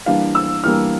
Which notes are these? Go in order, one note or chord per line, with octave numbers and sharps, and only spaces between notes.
E3 G3 A#3 D4 F5
E6
E3 G3 A#3 D4 F6